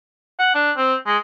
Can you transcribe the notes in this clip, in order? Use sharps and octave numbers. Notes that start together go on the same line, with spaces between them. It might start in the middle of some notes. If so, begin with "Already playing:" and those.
F#5
D4
C4
G#3